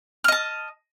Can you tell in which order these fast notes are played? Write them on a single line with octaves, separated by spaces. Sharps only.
F6 D#5 A5